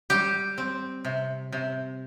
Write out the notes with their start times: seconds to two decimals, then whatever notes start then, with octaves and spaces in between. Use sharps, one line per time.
0.10 G3 G4
0.58 C4
1.05 C3
1.52 C3